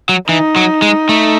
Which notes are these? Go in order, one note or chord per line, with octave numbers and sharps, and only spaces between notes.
F#3
E3 D#4
F#3
G#3
A3